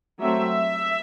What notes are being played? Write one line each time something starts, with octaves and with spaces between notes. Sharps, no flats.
F#3 A3 C4 E5